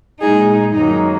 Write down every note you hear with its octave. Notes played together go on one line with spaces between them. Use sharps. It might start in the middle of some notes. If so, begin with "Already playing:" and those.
A#2 G#3 D#4 G#4
F#2 D#3 F#3 A#3 D#4